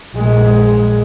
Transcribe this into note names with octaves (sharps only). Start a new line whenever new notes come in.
A#1 G#3